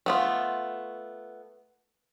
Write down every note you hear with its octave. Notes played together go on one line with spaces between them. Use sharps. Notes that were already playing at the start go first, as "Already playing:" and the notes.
A3 B3 F4